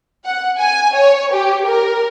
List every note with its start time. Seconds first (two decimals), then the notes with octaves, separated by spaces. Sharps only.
0.25 F#5
0.58 G#5
0.95 C#5
1.32 G4
1.66 A#4